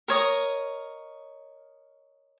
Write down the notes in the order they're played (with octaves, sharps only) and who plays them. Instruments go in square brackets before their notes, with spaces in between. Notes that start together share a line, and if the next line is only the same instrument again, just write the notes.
[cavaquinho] A#4 C#5 D#5